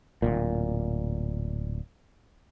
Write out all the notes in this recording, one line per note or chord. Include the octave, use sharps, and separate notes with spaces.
D1 G1 A#2